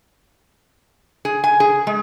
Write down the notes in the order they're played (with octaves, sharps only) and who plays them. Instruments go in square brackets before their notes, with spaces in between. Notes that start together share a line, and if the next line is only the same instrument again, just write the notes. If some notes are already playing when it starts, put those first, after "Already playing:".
[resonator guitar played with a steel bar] G#4
G#5
G#4
G#3